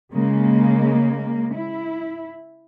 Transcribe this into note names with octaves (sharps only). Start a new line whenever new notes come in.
C#3 G#3 A#3
E4